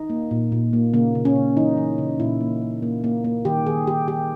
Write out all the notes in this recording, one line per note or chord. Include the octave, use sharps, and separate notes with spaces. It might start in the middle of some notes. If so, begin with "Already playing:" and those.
Already playing: D#4
A#3
A#2
A#2
A#3
C#3 A#3
C#3
C#4
C#3
E3 D#4
E3
C#3
A#2 E4
A#3
A#3
A#3
A#3
A#3
D#3 G4
D#3 G#4
D#3 G4
D#3 G4